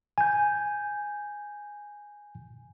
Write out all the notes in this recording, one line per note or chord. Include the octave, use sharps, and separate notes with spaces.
G#5 G6